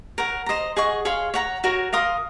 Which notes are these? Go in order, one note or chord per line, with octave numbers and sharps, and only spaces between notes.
A#4 C#5 F#5
C5 D#5 A#5
G#4 D#5 F#5 C#6
G#4 C#5 F5 C6
C#5 F#5 A#5
F#4 A#4 C#5
A#4 F5 C6 D#6